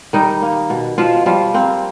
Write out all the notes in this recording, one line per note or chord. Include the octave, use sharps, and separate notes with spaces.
D#3 G3 D#4
A#3
B2
B2 F3 F4
F3 G3 F4
A#3 C4